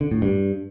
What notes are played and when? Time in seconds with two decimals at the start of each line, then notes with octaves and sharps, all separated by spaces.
0.01 D3
0.11 A2
0.22 G2